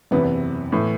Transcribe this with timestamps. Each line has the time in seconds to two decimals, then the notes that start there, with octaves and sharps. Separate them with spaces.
0.11 F#1 E2 C3 E3 B3
0.72 A2 E3